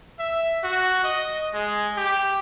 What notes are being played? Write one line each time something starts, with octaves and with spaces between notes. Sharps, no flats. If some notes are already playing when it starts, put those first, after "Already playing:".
E5
F#4
D#5
G#3
G4